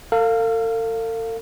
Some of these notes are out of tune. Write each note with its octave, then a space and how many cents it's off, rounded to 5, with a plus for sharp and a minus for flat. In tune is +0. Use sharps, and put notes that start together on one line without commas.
A4 +45 F5 +0